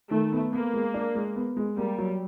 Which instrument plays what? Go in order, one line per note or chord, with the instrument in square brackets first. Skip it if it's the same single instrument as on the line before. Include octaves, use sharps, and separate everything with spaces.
[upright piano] D#3 [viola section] A3
[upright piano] B3
[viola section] A#3 [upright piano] B3
[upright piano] G#3
D4
G#3
B3
G#3
[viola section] G3 [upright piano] A#3
[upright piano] F#3